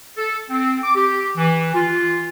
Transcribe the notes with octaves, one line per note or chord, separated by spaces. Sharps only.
A4
C4
D6
G4
E3
F4